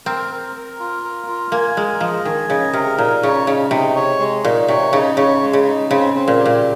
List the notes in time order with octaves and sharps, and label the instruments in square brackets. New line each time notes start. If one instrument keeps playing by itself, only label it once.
[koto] C4 [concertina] A#4
[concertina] A#4
A#4
F4
A#4
F4
[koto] A#3 [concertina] G#5
[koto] G#3 [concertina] A#4
[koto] F3 [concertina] D#5
[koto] D#3 [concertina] G#5
[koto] C#3 [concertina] D#5
[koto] C3 [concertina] A#4
[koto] A#2 [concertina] D#4
[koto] C#3 [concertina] C#5
[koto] C#3 [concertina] D#4
[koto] C3 [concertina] D#4
[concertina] C#5
G#3
[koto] A#2 [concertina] D#4
[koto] C3 [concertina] C#5
[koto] C#3 [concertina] D#4
[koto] C#3 [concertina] C#5
[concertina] G#3
[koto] C#3
[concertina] D#4
[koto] C#3 [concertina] C4
[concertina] C4
[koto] A#2
[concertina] G4
[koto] A#2